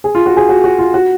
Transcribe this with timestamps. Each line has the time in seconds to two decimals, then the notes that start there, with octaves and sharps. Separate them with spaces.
0.04 G#4
0.15 F4
0.26 F#4
0.37 G#4
0.49 F#4
0.64 F#4
0.79 F4
0.94 F#4